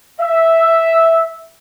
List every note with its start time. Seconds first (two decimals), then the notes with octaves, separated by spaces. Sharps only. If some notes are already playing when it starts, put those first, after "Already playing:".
0.20 E5